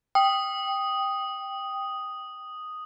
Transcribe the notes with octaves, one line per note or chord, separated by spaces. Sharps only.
G5 D#6